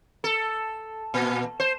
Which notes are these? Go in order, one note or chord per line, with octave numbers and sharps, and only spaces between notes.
A4
A#2
C5